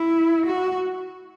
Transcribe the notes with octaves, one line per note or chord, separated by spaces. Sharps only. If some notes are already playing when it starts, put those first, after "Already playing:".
Already playing: E4
F#4